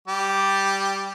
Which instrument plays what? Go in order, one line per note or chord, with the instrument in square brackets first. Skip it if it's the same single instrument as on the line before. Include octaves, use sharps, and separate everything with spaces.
[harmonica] G3 G4